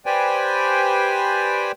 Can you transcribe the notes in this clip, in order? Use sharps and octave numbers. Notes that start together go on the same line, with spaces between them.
G4 B4 C5 D5 G5 G#5